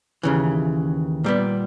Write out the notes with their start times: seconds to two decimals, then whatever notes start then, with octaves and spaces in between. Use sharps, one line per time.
0.23 D#2 C#3 E3
1.24 A#2 G3 B3